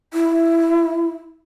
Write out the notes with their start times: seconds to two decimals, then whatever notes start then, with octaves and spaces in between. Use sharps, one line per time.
0.14 E4